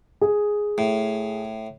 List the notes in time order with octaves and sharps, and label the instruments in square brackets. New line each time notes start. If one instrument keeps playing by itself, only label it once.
[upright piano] G#4
[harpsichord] A2